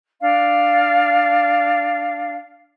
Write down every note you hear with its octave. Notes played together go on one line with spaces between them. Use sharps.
D4 F5